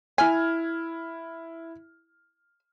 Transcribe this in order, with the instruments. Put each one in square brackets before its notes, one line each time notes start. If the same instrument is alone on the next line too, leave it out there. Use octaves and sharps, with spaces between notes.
[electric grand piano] E4 F6 G#6 [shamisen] G#5